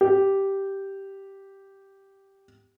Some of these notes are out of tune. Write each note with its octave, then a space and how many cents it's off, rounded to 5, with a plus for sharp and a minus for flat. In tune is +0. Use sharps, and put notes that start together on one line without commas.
G4 -5